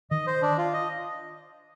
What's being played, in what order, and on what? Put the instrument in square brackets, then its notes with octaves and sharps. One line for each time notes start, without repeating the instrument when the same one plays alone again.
[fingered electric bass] D#3 [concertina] D#5
[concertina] C5
D4
F4
D#5